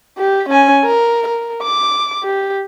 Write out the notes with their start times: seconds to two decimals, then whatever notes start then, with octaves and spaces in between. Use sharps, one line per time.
0.18 G4
0.50 C#4 G#5
0.85 A#4
1.28 A#4
1.62 D6
2.23 G4